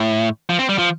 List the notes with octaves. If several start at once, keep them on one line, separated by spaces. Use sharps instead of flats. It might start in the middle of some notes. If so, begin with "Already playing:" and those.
Already playing: A2
F3
C4
G3
F3